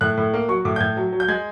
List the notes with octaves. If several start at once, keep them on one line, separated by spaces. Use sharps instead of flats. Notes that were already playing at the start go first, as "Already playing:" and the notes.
A2 F#6
A2
A#3
F#3 C#6
A2 D6
G6
A2 G#6
F#3
F#3
G6
G#3 G#6